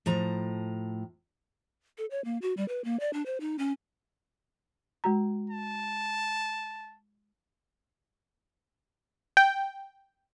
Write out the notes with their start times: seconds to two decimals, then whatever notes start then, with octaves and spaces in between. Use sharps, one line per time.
0.06 A2 F3 A#5
1.98 A4
2.11 C#5
2.25 A#3
2.42 F#4
2.57 G3
2.68 B4
2.84 A#3
3.00 D5
3.13 D4
3.26 C5
3.41 D#4
3.59 C#4
5.04 G#3 F#4 A#5
5.50 A5
9.37 G5